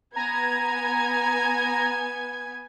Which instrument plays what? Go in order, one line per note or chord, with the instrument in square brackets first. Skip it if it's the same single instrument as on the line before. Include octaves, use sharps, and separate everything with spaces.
[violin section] B3 G#5 G#6 [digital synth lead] A#5